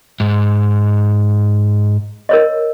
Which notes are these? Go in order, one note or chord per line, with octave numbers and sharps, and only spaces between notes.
G#2
A#4 C#5 D#5